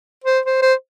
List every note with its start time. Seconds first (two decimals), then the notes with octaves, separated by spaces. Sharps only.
0.24 C5
0.46 C5
0.62 C5